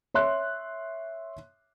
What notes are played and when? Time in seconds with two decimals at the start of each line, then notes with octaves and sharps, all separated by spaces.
0.14 C#5 E5 C6 F#6